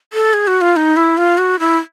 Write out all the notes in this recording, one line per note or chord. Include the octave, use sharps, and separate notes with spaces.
A4
G#4
F#4
F4
D#4
E4
F4
F#4
E4